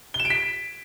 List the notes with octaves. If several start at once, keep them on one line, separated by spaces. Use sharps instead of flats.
G7
E7
D7
B6